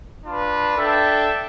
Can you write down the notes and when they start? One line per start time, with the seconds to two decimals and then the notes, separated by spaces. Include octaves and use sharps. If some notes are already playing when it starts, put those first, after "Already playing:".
0.25 D4 F4 B4
0.77 D4 A4 E5 G5